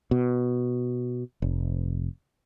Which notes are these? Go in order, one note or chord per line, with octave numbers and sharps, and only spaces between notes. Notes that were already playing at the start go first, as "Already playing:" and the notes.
B2
F1